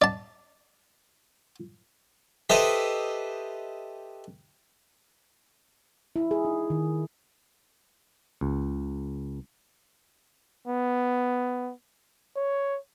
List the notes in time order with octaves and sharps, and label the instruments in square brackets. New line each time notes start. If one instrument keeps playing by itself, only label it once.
[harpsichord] D5 A5
G4 A4 B4 C5 D#5 E5
[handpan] E4
G#4
D#4
D#3
[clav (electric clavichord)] C#2
[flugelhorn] B3
C#5